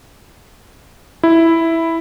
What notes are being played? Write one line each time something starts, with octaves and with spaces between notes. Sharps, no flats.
E4